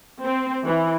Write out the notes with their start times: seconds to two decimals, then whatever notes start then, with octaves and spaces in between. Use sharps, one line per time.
0.23 C4
0.64 E3